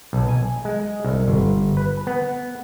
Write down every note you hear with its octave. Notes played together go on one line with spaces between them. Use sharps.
B1
G#5
G#3
C2
G1
B4
B3